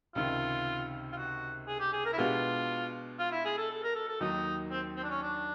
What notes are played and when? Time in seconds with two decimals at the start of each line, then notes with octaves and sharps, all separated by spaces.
0.15 C#2 C3 D#3 F4
1.12 F4
1.17 F#4
1.67 G#4
1.80 G4
1.93 G#4
2.05 A#4
2.13 E4
2.18 B2 G#3 B3 D4 F4 G4
3.19 F4
3.32 E4
3.45 G#4
3.58 A4
3.70 A4
3.83 A#4
3.95 A4
4.09 A4
4.20 D#2 D#3 F#3 D#4
4.71 C4
4.96 C4
5.03 D4
5.10 C#4
5.22 D4